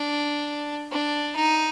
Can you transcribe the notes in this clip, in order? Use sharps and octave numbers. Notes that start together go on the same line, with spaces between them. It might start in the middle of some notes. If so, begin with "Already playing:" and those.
Already playing: D4
D4
D#4